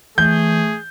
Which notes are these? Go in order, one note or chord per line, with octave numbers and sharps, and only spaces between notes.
E3 A3 G#4 G6